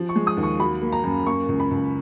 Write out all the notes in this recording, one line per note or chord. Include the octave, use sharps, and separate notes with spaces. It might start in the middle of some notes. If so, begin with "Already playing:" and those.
Already playing: F3
C#6
G#3
D#6
D#2
C#6
F#3 B5
A#3
A#5
F#2
A#3 C#6
C#2
B5
C#2